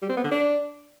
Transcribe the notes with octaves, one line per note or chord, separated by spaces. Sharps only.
G3
C4
B3
D3
D4